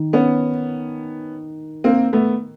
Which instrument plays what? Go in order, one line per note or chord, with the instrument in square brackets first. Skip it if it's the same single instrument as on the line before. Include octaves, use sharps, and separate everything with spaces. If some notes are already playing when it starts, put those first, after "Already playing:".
Already playing: [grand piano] D#3
[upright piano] B3 C#4
A#3 C4
A3 B3